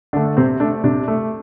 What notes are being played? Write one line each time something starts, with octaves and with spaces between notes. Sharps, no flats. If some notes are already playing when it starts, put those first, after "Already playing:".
D3 A3 D4
C3 C4
A3 D4
C3 D4
A3